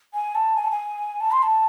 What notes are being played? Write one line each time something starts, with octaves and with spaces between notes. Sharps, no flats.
G#5
A5
G#5
A5
G#5
A5
C6
A5